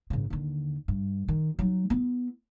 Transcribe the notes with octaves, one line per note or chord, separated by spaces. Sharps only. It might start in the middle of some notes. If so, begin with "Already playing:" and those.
G#1 C#3
D#2 D3
G2
D#3
F#3 D#4
B3 E4